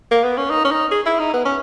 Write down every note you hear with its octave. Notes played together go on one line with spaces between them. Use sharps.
A#3
B3
C#4
D#4
C#4
D#4
G#4
E4
D#4
B3
C#4